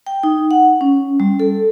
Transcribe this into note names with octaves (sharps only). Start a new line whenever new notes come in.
G5
D#4
F#5
C#4
G3
A4